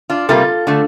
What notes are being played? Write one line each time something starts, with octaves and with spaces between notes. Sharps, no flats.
D4 F4
C3 G3 A#3 F4 A4
D3 A3